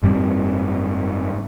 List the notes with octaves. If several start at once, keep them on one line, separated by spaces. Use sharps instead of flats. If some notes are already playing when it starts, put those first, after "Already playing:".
F#1 G#2 G3 C4